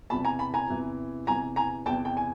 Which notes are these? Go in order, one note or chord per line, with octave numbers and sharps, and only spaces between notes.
E2 C3 E3 A5 B5
G#5 A#5
A5 B5
G#5 A#5
E2 C3 E3
E2 C3 E3 G#5 A#5
G#5 A#5
E2 C3 E3 G5 A5
G5 A5
G#5